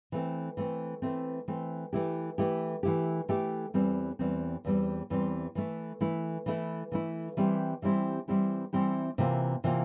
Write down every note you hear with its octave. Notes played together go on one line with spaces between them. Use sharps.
E3 A3 C4
E3 A3 C4
E3 A3 C4
E3 A3 C4
E3 A3 E4 G4
E3 A3 E4 G4
E3 A3 E4 G4
E3 A3 E4 G4
E2 E3 G3 C4
E2 E3 G3 C4
E2 E3 G3 C4
E2 E3 G3 C4
E3 A3 E4
E3 A3 E4
E3 A3 E4
E3 A3 E4
E3 G3 C4 E4 G4
E3 G3 C4 E4 G4
E3 G3 C4 E4 G4
E3 G3 C4 E4 G4
C3 E3 A#3 F4
C3 E3 A#3 F4